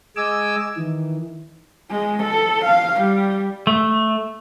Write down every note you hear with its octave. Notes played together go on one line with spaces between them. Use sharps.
G#3 D#5 G#5 D6 E6
D#3 E3
G#3
A4
F5
G3
A3